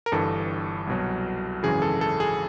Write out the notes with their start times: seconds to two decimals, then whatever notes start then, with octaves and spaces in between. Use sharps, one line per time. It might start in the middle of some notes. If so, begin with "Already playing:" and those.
0.06 A#4
0.12 G1 G2 E3 A4
0.87 C2 B2 F#3
1.63 G#1 F#2 C#3 E3 G#4
1.82 A4
2.01 A4
2.20 G#4